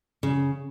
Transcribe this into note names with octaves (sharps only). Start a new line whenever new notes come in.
C#3